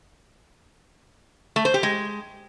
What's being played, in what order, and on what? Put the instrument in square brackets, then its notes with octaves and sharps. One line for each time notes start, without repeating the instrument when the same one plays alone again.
[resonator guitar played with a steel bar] A3
C5
G4
G#3